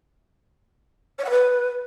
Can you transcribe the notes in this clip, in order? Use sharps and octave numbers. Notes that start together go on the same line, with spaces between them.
C#5
F#5
B4